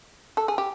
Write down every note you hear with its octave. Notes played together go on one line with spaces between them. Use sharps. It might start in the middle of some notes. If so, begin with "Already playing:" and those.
A4
G#4
G4